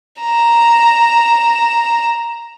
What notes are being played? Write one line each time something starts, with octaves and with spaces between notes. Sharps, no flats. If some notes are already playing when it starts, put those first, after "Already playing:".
A#5 E7